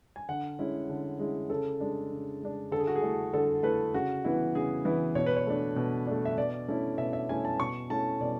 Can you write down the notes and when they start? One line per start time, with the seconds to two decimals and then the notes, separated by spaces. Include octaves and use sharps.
0.16 G#5
0.28 D3 F#5
0.59 G#3 C#4 E4
0.89 D3
1.19 G#3 C#4 E4
1.50 C#3 A4
1.80 G#3 D4
2.11 C#3
2.42 G#3 D4
2.71 D3 A4
2.80 G#4
2.87 F#4
2.96 G#4
3.02 A3 E4
3.34 D3 A4
3.63 A3 E4 B4
3.94 C#3 F#4
4.25 E3 B3 E4
4.55 C#3 G#4
4.85 E3 B3 E4
5.15 B2 C#5
5.26 B4
5.36 C#5
5.47 A3 D4
5.76 B2
6.07 A3 D4
6.25 E5
6.37 B2 D5
6.68 A3 C#4 E4
6.98 B2 E5
7.13 E5
7.29 A3 C#4 E4 G#5
7.45 A5
7.59 B2 C#6
7.90 A3 C#4 E4 A5
8.20 B2 D5